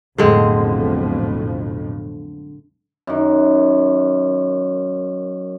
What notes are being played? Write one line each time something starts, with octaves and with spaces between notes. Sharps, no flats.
B1 F2 A2 D3 G#3 C4
F#2 D#3